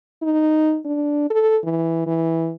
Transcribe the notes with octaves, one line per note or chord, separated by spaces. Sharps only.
D#4
D4
A4
E3
E3